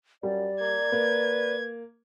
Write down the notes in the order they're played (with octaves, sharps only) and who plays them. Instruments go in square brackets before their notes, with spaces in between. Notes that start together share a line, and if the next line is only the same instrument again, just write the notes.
[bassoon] F#2 [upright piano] G3 [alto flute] D5
[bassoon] A#3 [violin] G#6
[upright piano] A#3 [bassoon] B4